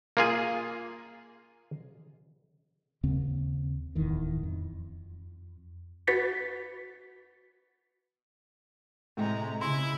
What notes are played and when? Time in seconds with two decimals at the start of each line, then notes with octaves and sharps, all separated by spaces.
0.17 A#3 F4 G#4
3.03 D#2 C#3 C4
3.95 D1 E2 D#3 E3
4.43 F2
6.07 F#4 B4 A6 B6 C#7
9.17 A2 C3 G#3 A#5
9.61 C#3 E4 G#5 C6